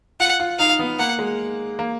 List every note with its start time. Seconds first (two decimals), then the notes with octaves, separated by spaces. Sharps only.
0.20 F4 F#5
0.40 F4
0.59 D#4 F5
0.79 B3
0.99 A#3 F#5
1.19 G#3
1.79 A#3